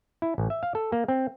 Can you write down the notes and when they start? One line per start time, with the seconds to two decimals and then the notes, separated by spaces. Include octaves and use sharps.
0.22 E4
0.38 A1
0.50 E5
0.63 F5
0.75 A4
0.92 A#3
1.08 C4